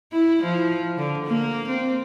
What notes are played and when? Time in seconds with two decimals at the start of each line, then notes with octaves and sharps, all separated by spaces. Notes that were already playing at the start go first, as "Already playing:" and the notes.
0.12 E4
0.43 F3
0.97 D3
1.26 A#3
1.69 C4